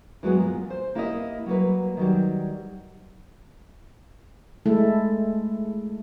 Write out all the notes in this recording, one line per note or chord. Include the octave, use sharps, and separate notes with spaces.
E3 F#3 G#3 B3
A#2
C5
A#3 E4 G4 A#4 D5 D#5
F#3 G3 A#3 B4
D#3 F#3 G3
G#3 A3 E4 A4